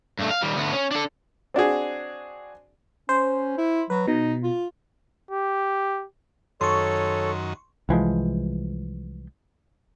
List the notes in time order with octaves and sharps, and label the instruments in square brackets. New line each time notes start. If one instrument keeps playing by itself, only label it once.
[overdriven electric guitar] G2 A3
F5
D#3 G3
D2 B3
C#4
D4 A4
[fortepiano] C4 D4 F#4 G#4
[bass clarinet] C#4 [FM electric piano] C5
[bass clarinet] E4
[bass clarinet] F#3 [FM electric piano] B4
[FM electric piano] B2 [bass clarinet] D#4
[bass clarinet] F4
[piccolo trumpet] G4
[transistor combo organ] F#2 D#3 [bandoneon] A4 [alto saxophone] C#5 [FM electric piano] C6 C#6
[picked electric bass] C2 E3 F3 G#3